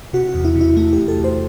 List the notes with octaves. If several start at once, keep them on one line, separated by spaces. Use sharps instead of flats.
C3 F#4
F#4
E2
E4
C3
E4
A3 E4
G4
E2
A4
E2
C5